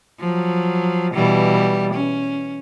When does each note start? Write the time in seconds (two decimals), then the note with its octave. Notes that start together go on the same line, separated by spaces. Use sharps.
0.21 F3 F#3
1.14 B2 E3 G3
1.94 C#4